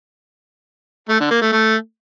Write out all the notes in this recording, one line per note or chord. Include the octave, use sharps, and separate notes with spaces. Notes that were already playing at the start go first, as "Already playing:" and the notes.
A3
D3
A#3
A3
A3